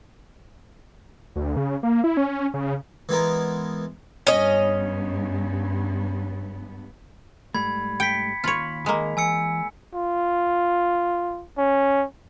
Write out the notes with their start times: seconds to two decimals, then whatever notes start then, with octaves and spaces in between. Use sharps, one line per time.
1.36 D2
1.57 C#3
1.83 A#3
2.04 E4
2.17 C#4
2.54 C#3
3.09 E3 G#3 B3 A#4
4.27 G2 B3 C#4 D#5
7.54 G#2 G3 A3 B5 G#6
8.00 G5 B6 C#7
8.44 D#2 F4 C#5 B5
8.86 D#3 G#3 A#3 D#5 A#5
9.17 E3 G#5 E6 C#7
9.95 F4
11.58 C#4